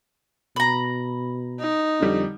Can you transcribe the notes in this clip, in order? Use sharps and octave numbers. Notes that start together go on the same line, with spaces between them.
B2 A#5 B5
D#4
F2 D3 G3